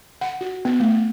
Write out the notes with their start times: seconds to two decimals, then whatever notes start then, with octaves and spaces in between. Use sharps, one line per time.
0.21 F#5
0.41 F#4
0.65 B3
0.80 A3